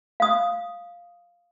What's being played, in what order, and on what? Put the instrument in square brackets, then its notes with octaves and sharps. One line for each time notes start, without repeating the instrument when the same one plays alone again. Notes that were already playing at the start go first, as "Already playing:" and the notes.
[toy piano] F5 D#6